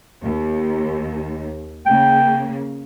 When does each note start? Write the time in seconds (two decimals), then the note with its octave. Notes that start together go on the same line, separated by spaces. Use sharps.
0.22 D#2
1.86 C#3 A#3 G5